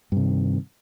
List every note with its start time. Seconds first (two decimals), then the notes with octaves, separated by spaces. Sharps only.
0.12 G2
0.17 C3
0.21 D#3